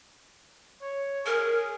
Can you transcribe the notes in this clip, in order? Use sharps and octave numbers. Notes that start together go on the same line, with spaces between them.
C#5
G#4 A#4